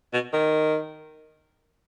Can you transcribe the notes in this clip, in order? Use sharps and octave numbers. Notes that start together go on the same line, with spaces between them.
B2
D#3